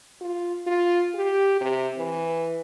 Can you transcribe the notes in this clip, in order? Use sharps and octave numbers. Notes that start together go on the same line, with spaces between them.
F4
F4
G4
C3
E3